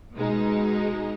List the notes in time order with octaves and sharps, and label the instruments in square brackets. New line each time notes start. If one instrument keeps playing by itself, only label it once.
[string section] B2 G#3 D#4